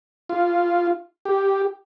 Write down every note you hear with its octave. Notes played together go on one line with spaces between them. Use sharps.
F4
G4